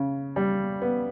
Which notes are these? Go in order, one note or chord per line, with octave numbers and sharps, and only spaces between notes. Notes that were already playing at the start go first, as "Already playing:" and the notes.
Already playing: C#3
G3
B3